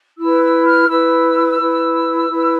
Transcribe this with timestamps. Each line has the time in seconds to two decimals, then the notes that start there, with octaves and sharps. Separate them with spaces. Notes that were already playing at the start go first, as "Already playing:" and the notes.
0.17 E4 B4 E6
0.41 E6
0.65 F6
0.88 E4 B4 E6
1.59 E4 B4
2.29 E4 B4